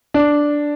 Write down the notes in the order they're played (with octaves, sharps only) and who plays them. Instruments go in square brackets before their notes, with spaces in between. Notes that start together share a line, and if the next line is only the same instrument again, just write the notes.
[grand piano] D4